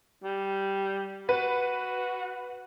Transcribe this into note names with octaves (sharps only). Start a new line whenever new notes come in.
G3
F#4 B4